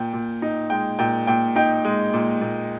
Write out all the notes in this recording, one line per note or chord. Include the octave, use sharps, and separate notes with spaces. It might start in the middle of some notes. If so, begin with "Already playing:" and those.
Already playing: A#2 G5
A#2
D#4
G#3 G5
A#2 G5
A#2 G5
D#4 G5
G#3
A#2
A#2